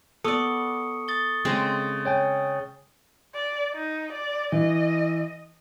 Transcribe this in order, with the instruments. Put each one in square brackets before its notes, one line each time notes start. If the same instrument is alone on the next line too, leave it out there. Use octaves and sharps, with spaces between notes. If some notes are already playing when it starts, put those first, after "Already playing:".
[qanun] B3 D5 [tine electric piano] A4 [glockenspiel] C#6 D#6 C#7
[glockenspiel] D#6 A6 G7
[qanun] C#3 G#3 C4
[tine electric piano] C#5 G5 G#5
[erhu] D5
D#4
D5
[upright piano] E3 [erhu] D#5